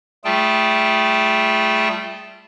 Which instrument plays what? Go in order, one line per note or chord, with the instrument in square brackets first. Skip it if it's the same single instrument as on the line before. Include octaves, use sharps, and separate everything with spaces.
[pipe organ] G3 A3 F4 G#4 G5 A5